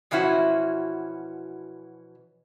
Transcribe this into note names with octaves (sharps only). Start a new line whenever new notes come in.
B2 E3 F3 C#4 E4 F#4